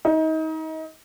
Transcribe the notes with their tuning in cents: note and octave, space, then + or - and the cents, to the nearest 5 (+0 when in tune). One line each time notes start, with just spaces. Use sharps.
D#4 +30